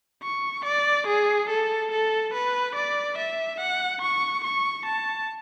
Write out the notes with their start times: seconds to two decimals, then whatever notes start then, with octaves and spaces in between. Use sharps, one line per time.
0.23 C#6
0.65 D5
1.07 G#4
1.50 A4
1.92 A4
2.34 B4
2.75 D5
3.18 E5
3.60 F#5
4.02 C#6
4.44 C#6
4.86 A5